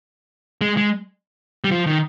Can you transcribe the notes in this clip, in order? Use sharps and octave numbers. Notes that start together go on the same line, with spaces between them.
G#3
G#3
G3
F3
D#3